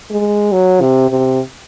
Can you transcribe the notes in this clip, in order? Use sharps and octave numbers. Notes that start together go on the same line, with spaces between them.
G#3
F#3
C3
C3